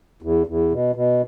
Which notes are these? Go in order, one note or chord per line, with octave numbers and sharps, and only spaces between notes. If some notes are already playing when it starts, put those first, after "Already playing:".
E2
E2
B2
B2